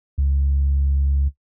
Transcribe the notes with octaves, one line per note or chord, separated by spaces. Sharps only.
C#2